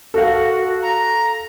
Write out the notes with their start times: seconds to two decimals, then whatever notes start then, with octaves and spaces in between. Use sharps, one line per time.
0.14 F#4 A4 F5
0.83 A#5